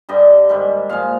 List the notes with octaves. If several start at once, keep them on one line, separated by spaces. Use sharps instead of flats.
G2 D3 G3 D#5
G#2 D#3 G3
A#2 F3 G#3 F5